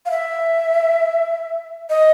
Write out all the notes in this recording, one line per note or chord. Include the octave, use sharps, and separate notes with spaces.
F5
E5
D#5